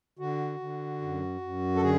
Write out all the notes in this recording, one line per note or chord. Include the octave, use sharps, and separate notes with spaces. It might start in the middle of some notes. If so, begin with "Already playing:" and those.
D3 F#4
D3
F#2
F#2
A4
D3 G#4